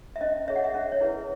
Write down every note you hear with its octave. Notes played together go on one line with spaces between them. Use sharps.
E5
C#4 D#5
G#4 C#5 E5
F#5
E5
C#4 E5
C#5
E4 G#4 B4